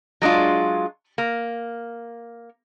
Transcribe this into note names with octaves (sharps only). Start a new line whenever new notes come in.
F#3 G#3 D4 F4
A#3